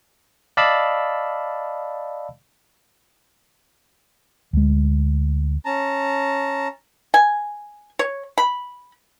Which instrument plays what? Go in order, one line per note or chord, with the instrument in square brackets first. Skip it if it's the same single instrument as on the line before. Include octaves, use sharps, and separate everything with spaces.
[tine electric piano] D5 D#5 F5 A5 B5 E6
[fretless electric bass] D2 G#3
[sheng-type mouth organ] C#4 A5 A#5
[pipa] G#5
C#5
B5